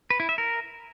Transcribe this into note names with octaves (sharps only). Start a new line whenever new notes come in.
B4
E4
E5
A#4